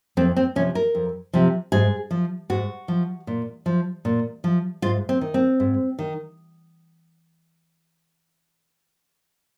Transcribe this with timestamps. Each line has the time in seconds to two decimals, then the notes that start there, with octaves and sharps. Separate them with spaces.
0.17 F2 C4
0.36 C4
0.56 C3 F3 C#4
0.75 A#4
0.95 F2
1.33 C3 F3
1.72 G#2 G#4
2.11 F3
2.50 G#2 F#4
2.88 F3
3.27 A#2
3.66 F3
4.05 A#2
4.44 F3
4.82 G#2 F4
5.09 C4
5.21 D#3
5.34 C4
5.60 G#2
5.99 D#3